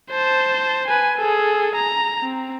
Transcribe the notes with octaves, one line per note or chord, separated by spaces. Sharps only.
C5 A5
B4 G#5
G#4 A4
A#5
C4